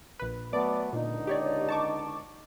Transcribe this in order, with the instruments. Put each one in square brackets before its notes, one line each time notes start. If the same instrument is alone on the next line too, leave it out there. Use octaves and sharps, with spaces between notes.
[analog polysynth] A#1 B4
[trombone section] F#3 A3 B3 [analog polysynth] D5 D6
[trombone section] C#2 D3 D#4 [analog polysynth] A#2
[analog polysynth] G4 C#5 D5
A5 C#6 D6